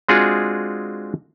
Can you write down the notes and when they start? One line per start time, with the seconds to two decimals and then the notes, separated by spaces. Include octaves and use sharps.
0.09 G#3 C4 D4 F4 F#4 G#4